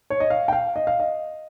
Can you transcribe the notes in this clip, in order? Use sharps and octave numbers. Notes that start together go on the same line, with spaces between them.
C#5
D#5
F5
G5
F5
D#5
F5
D#5